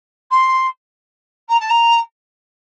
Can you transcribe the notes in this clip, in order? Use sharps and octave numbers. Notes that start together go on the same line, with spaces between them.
C6
A#5
A5
A#5